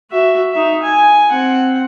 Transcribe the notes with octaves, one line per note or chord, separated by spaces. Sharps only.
F#4 E5
D#4 E5
G#5
C4 F#5